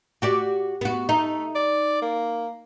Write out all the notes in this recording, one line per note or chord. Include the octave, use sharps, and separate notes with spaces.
F#4 G4 D5
B3 F#4
A3 D#4
D5
A#3